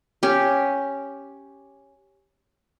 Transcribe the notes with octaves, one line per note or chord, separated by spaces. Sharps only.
C#4 G4